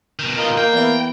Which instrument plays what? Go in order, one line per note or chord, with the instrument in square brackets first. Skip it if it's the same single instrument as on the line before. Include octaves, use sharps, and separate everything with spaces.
[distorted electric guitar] B2 D#3
[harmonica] F4 A#4 D#5
[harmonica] A#3 [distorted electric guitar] G5
[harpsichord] E2 E4